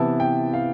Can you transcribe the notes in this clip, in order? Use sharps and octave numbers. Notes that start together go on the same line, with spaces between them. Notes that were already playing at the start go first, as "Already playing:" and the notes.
Already playing: C3 E3 B3 E4 A5
G5
F5